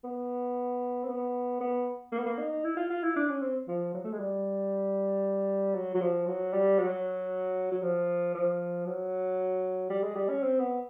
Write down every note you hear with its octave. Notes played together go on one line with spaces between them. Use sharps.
B3
C4
B3
B3
A#3
B3
A#3
D#4
E4
F4
F4
E4
D4
C#4
C4
F3
F#3
A3
G#3
G3
F#3
F#3
F3
F#3
G3
F#3
F#3
F3
F3
F#3
G3
G#3
G3
C#4
C4
B3